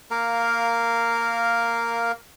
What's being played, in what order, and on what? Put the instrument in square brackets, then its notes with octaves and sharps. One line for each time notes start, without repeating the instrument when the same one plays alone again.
[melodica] A#3 A#4 F5